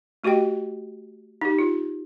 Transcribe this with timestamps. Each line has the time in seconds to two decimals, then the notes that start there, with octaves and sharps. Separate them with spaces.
0.24 A3 F#4 G4 D#5 G5
1.41 D#4 G4
1.59 F4